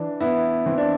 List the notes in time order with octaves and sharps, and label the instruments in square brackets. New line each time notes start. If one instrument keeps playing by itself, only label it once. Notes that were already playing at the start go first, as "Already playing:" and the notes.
Already playing: [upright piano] E3 [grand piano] D4
[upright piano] B3 E4
[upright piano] E3 [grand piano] C4
[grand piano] D4